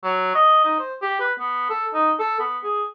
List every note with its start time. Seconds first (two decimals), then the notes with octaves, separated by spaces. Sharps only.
0.04 F#3
0.35 D#5
0.64 D#4
0.79 C5
1.02 G4
1.20 B4
1.39 B3
1.70 A4
1.94 D#4
2.19 A4
2.40 B3
2.64 G#4